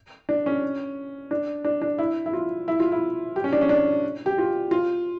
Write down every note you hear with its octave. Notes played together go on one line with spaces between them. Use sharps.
D4
C#4
D4
D4
D4
E4
E4
F4
E4
F4
E4
G4
C#4
D4
C#4
D4
G4
F4
F4